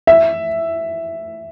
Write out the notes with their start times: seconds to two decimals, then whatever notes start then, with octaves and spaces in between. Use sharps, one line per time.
0.07 E5